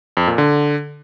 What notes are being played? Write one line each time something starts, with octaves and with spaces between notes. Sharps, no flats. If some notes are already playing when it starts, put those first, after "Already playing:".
F2
A#2
D3